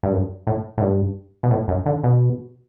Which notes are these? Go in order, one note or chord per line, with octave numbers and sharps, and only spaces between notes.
G2
F#2
A2
A2
G2
B2
A2
F#2
D3
B2